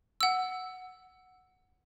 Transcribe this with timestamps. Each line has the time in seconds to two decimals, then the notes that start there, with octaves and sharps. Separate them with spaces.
0.21 F#5 E6